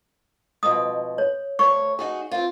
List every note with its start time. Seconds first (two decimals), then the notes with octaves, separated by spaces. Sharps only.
0.63 F2 G#2 B2 D#6
1.18 C#5
1.59 D2 C#5 C#6
1.99 D#4 F#4 G#4
2.31 C4 F4